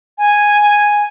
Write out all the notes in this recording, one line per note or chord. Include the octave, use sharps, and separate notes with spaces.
G#5